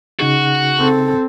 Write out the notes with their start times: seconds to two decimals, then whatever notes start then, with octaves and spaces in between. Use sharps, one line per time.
0.20 C#3 D#4 F#4 G#4
0.79 C4 A4